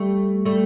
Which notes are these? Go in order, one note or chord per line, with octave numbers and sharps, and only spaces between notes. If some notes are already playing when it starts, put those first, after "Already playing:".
Already playing: G3 A3
G3 A3